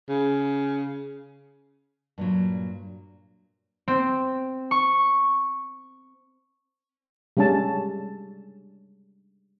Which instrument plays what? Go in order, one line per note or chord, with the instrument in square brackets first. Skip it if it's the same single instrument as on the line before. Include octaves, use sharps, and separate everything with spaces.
[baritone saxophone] C#3
[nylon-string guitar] G2 A#2 F#3
[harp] C4
C#6
[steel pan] G3 G#3 C#4 D4 A5